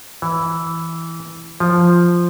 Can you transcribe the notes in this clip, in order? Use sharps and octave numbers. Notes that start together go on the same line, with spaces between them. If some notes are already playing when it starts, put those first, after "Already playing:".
E3
F3